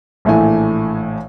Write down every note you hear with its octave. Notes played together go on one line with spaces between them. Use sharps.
A#1 A2 E3 A3 G#5